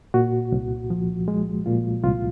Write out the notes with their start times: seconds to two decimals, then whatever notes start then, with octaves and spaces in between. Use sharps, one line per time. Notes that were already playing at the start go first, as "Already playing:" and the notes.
0.14 A#2 F#4
0.52 C2
0.90 F3
1.28 G#3
1.66 A#2 F4
2.03 C2 F4